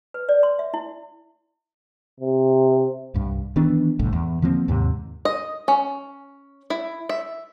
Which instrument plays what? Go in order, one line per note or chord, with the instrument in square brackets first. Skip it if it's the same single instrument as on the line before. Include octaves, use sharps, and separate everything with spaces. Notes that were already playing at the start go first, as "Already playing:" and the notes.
[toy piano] B4
D5
C6
E5
E4
[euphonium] C3
[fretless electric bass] C2 G2
D#3 E3 B3 D4
G1 C2 A2
E2
D3 F3 A#3 C4
D#2 G#2 C3
[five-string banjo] D#5
C#4
E4
E5